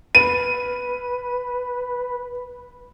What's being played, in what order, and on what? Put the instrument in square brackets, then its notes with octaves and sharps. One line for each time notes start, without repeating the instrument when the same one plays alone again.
[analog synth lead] B4 [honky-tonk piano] D#7